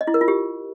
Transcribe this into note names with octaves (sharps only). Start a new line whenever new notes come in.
D#5
E4
A#4
F4
G4